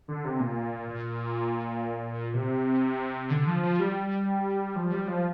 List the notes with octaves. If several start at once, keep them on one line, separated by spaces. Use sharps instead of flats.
D3
C3
A#2
A#2
C3
D3
F3
F3
G3
F3
G3
F3